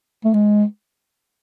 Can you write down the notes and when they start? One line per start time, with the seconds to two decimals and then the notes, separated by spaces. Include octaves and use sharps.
0.25 A3
0.34 G#3